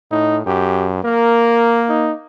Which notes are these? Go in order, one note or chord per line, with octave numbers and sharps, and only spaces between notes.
A2 D#4
F#2 G4
A#3 A#4
D#4